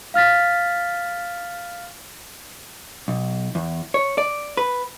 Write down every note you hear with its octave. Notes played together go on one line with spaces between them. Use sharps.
F5 F6 A6 B6
B1
E2
C#5
D5
B4